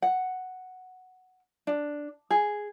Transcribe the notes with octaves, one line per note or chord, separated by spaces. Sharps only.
F#5
D4
G#4